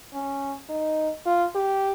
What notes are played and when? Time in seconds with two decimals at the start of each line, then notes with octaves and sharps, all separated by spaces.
0.13 C#4
0.70 D#4
1.26 F4
1.55 G4